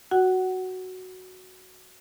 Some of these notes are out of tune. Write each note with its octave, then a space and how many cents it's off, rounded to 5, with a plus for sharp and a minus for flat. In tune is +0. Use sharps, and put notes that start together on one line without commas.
F#4 +0 F#5 +20